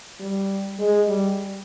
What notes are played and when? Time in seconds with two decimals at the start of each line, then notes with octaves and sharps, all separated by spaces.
0.20 G3
0.79 G#3
1.08 G3